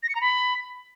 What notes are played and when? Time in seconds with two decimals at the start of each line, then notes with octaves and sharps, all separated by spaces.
0.03 A#6
0.09 C#7
0.15 A#5
0.21 B5